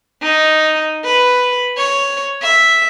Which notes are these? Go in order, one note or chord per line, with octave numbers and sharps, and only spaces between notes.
D#4
B4
C#5
E5